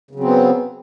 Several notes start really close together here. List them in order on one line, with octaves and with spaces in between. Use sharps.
C#3 F#3 C4 B3